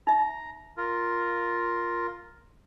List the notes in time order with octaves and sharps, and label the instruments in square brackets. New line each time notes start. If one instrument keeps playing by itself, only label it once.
[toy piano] D#4 E5 [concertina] A#5
[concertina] F4 A#4